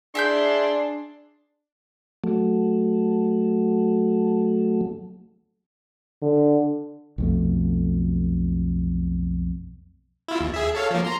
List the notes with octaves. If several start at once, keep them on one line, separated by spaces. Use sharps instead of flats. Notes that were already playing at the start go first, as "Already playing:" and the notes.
D4 E4 G#4 E5 C6 G6
F#3 A3
D3
B1 F2 A3
E4 F4
D#2
G#4 E5
A4 C#5 F5
F3 A#3
A#5 C6